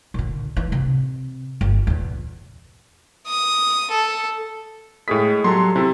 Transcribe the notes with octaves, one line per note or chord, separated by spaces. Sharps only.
A#2 D3
E3
C3
G1
E2 A#2
D#6
A4
A2 G#3 G#4 D#6 B6
F#3 G3 A4 C6
C3 E4